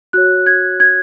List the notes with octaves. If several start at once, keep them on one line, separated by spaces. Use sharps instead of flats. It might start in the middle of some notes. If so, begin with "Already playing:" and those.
F#4 C#5 F#6
G#6
G#6